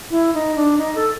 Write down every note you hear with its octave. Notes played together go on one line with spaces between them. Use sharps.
E4
D#4
D4
D#4
A4